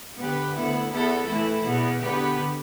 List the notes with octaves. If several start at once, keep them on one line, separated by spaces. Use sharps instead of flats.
D3 B3 G4 B4
D2 D3 B3 E4
E2 E3 B3 E4 A4
A2 E3 A3 E4
E2 B2 B3
D3 B3 G4 B4